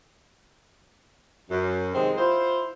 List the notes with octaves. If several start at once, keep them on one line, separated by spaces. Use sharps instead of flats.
F#2
C3 D#3 G#3 C4
E4 F4 C5